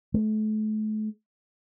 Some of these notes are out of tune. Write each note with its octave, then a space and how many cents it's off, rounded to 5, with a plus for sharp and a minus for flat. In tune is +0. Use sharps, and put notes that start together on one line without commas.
A3 -35